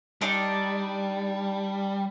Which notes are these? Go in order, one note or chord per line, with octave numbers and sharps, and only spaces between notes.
G3 D4 D#4